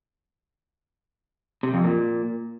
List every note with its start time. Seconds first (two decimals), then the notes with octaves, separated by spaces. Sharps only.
1.63 C3
1.74 F2
1.84 A#2